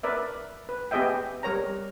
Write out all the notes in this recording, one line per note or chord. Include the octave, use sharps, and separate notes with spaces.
A#4 B4 D5 E5
B4
B3 G4 G#4 D#5 E5 G5
G3 A#4 C#5 A#5